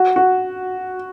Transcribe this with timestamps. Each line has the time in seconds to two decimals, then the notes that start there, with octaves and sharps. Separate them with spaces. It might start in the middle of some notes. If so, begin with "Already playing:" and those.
Already playing: F#4
0.16 F#4